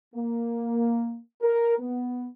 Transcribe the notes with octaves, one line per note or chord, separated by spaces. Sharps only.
A#3
A#4
B3